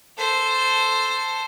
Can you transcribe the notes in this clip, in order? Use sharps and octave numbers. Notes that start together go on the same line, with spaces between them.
A4 C5